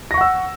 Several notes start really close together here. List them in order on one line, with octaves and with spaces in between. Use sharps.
A#6 C#6 F#5 E6